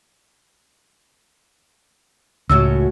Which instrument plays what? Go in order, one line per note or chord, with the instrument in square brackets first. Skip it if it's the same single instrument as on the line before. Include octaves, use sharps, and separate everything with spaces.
[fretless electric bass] C#2 [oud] F#2 A2 F#3 [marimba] E6